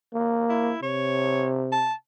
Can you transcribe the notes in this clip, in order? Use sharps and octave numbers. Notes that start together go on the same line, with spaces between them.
A#3
E4
C3 C#5
A5